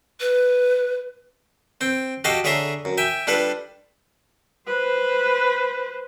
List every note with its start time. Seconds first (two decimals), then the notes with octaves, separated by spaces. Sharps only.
0.20 B4
1.81 C4 G5
2.24 F#4 G4 A4 D#5 F5 G5
2.44 D3 G#4 C#5 E5 A#5 C6
2.85 F#2
2.98 E5 G5 G#5
3.27 G3 D4 F4 A4 B4
4.67 B4 C5